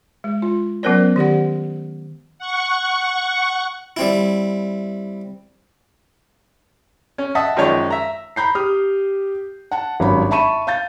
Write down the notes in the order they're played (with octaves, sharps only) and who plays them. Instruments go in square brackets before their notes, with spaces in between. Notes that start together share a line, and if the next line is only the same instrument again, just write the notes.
[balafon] G#3
F4
F#3 B3 C#4 A#4 C5 D5
D#3 G4 D5 F#5
[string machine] F#5 C#6
[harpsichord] G3 C4 E4
[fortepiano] C#4
D#5 E5 F#5 A5 D#6
F#2 D#3 F3 G#3 C#5 D5
E5 A#5
[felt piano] A#5 B5 G6 C7
G4 D#6 F6
F#5 A5
G#1 G2 F#3 C#4 C#5 B5
E5 A5 B5 C#6 D#7 E7
F5 G6 A6